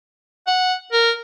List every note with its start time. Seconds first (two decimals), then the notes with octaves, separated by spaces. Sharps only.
0.47 F#5
0.92 A#4